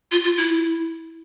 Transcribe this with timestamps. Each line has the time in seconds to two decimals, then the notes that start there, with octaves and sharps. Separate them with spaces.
0.11 F4
0.24 F4
0.37 E4